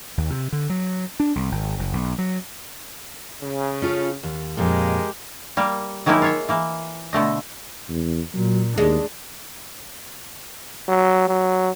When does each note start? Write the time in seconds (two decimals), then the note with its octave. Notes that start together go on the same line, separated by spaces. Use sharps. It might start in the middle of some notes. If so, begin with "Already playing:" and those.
0.18 D#2
0.30 C3
0.53 D3
0.70 F#3
1.20 D4
1.36 C2
1.52 G#1
1.79 F#1
1.93 B1
2.18 F#3
3.41 C#3
3.82 C#4 F4 A4
4.23 D#2
4.57 F2 A#2 G#3 G4 A#4
5.57 G3 A#3
6.06 D#3 F#3 G#3 A#3 D#4 E4
6.22 F4 C#5 E5
6.49 E3 A#3
7.13 B2 D3 A3 D#5
7.89 E2
8.34 A#2 F#3
8.78 D#2 G#3 D4
10.89 F#3
11.28 F#3